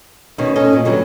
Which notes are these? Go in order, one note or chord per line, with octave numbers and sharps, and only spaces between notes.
B2 D#3 B3 C#4 D#4
C#4 A4 D#5
A#2
D3 F#3 G3 B3